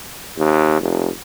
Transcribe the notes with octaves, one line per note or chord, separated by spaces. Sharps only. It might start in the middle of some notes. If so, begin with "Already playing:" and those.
D#2
F1